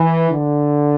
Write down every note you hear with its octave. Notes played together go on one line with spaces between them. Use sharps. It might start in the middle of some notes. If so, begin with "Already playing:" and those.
Already playing: E3
D3